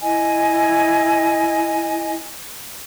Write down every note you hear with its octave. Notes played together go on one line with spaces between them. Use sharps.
E4 D#5 G#5